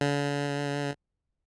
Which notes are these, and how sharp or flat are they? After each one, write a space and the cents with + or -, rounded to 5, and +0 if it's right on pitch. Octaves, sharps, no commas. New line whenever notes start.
D3 -45